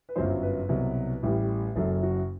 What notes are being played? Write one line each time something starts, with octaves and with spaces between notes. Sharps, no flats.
B4
G1 F#2 F#3 C5
B4
C2 B2 F#3
A1 A2 G3
F#1 F#2 F#3 A4
F#4